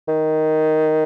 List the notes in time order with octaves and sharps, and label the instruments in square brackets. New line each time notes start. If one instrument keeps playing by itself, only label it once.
[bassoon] D#3